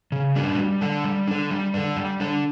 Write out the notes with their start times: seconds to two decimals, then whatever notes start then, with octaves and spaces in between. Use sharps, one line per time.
0.12 C#3
0.35 G3 D4 F#4
0.59 G3
0.81 D4 A4
1.04 G3
1.28 D4 A4
1.51 G3
1.74 D4 A4
1.97 G3
2.20 D4 A4